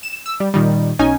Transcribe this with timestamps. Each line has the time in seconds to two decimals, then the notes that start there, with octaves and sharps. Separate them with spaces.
0.03 E7
0.26 E6
0.40 G3
0.54 A#2 D#3 G3
0.99 B1 C#4 D#4 G#5